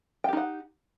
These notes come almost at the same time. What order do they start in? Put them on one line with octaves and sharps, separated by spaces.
G5 G4 D#4 F#5